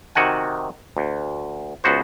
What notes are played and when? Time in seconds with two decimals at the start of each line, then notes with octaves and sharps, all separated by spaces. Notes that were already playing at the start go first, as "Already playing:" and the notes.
0.15 C3 D#3 F#4 F#5 G#5
0.97 D2
1.84 C#2 B3 F#4 C5